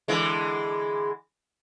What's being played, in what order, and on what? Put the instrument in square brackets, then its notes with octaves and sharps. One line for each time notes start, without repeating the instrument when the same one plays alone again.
[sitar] D3 E3 G#3